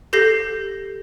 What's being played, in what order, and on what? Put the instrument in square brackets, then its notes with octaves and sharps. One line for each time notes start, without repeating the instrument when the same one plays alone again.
[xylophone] G4 A4 G6 A#6 C7